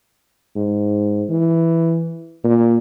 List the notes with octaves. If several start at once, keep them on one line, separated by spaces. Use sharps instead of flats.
G#2
E3
A#2